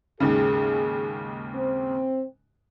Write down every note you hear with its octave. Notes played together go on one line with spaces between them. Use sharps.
D#2 G#2 C#3 G#4
C4